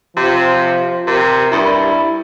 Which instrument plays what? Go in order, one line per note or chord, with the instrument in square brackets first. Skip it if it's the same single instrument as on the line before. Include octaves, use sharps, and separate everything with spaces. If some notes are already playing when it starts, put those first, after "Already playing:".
[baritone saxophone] C3 [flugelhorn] F3
[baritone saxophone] C3 [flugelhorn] A#4
[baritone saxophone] G2 [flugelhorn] E4